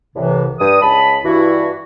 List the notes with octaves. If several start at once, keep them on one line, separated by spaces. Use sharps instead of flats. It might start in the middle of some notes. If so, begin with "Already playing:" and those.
C2 A2 C3 E3
G2 D#6
C#2 A5 B5
G2 E3 E4 F#4